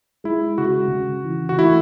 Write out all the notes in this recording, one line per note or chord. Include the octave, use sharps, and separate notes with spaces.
G#3 E4
C#3 F#4
C#3
E3
F#4
A3 E4